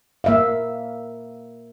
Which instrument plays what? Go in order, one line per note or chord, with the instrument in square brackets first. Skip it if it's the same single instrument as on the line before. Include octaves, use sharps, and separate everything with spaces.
[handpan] A#3 E5 F5